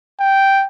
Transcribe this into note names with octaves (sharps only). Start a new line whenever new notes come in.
G5